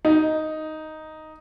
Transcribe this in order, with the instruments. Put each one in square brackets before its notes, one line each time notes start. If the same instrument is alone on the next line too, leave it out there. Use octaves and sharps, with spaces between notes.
[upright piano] D#4